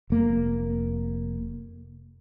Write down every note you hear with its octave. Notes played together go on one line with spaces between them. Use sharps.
F1 A#3